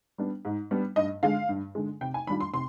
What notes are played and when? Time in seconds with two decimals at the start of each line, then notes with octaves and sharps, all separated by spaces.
0.18 G3 B3 D4
0.45 G#2
0.71 G3 B3 D4
0.96 G2 D#5
1.23 D3 G#3 F5
1.49 G2
1.75 D3 G#3
2.01 C3 G5
2.14 G#5
2.27 D#3 G3 D4 F4 B5
2.40 C6
2.54 C3 C6